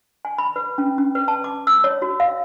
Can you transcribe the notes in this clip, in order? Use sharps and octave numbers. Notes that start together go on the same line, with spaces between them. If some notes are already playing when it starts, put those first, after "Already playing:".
G#5
B5
B4
C#4
C#4
B4
A5
D6
E6
C#5
F#4
F5